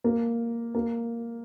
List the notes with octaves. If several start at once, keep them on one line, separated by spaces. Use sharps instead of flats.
A#3
A#3